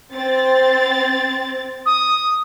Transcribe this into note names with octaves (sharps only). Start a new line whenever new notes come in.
C4 A6
D#6